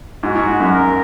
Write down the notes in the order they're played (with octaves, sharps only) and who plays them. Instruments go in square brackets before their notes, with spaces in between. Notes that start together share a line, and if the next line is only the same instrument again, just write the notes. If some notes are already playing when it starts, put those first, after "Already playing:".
[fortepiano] G#2 [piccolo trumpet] F#4
[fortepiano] G#2
F#2
[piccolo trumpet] A#4